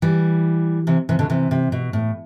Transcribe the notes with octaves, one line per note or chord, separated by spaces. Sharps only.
E3 G3
C3 E3
C3 E3
B2 D3
C3 E3
C3
B2
A2